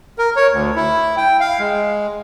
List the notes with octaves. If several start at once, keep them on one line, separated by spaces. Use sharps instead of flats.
A#4
C#5
D2
E4
G5
F5
G#3